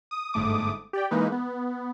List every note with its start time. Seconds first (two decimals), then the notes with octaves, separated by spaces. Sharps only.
0.11 D#6
0.33 G1 G#2 A3 D6 D#6
0.93 G4 D5 G5
1.11 E3 G#3 A#3 D#4 B4
1.32 B3